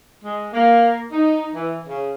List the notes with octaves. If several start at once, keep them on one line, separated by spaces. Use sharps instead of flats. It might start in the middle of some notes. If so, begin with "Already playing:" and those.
G#3
A#3
D#4
E3
C#3